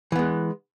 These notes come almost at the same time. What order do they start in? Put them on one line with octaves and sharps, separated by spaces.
E3 B3 G#3